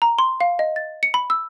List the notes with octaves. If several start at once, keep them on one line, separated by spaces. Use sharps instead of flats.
A#5
C6
F5
D#5
A6
C#7
B5
E6